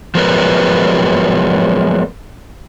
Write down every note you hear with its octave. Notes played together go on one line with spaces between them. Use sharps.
F3 F#3 G#3 B3 A#4 B4